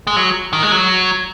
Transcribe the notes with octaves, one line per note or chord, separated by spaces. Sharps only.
G#3
F#3
D#3
G#3
F#3